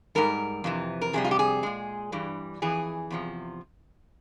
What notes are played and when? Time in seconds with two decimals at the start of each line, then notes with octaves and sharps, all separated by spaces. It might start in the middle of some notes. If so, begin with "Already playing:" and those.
0.15 G#2 G3 A#4
0.64 F2 C3 E3
1.01 A#4
1.13 F2 C3 G3 G#4
1.24 F4
1.31 G4
1.39 G#4
1.63 A#2 G#3
2.12 G2 E3 G3
2.62 F2 E3 G#4
3.10 E2 C3 F3